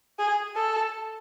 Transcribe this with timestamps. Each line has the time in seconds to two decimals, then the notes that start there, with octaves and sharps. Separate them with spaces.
0.19 G#4
0.56 A4